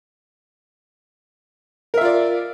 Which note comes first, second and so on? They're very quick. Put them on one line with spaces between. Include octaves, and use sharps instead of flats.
A#4 E5 F4 D5